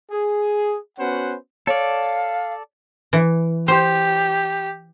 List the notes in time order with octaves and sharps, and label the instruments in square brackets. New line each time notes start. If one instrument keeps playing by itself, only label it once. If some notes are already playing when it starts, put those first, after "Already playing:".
[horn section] G#4
B3 C#4 F#4 B4 C5 F#5
[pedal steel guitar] A4 D5 [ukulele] C#5 [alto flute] F5
[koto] E3
[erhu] G4 [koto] C5